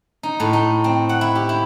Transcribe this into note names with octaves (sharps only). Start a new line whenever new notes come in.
D#4
A2
D#4
C4
F#5
E4
G4
E4